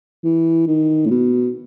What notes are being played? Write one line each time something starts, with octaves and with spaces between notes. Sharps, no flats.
E3
D#3
A2
B2